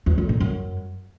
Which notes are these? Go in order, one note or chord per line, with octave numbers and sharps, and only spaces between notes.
E2
F2
A#2
F#2